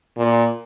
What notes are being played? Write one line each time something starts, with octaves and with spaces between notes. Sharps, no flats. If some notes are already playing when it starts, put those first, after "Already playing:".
A#2